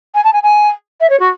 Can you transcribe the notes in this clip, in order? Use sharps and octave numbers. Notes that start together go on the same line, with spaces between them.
G#5
A5
G#5
G#5
E5
C#5
F#4